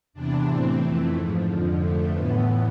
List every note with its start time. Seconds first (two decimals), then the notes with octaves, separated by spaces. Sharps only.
0.13 E2 C3 E3 D4
0.46 A2 E3 C4
0.80 F2 E3 A3
1.13 G#2 F3
1.47 F2 D3 F3
1.79 F2 D3 F3 A3
2.12 A2 E3 B3